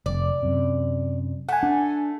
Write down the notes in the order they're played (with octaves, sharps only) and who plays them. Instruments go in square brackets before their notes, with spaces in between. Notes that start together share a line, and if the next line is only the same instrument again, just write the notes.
[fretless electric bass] F1 [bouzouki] D5
[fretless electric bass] F#2 C3
[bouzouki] A3 [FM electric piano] F#5 G#5
[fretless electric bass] D4